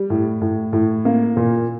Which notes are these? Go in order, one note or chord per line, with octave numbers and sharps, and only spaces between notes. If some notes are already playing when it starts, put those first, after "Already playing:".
Already playing: G3
A2
A2
A2
A#3
A#2